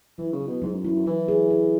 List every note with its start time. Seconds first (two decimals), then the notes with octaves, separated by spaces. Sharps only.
0.18 E3 F#3
0.33 C#3
0.41 E4
0.47 B2
0.62 G#2 F#3
0.74 F#2
0.84 F#2 E4
0.95 F#2
1.06 E3 E4
1.28 G#4
1.50 G#4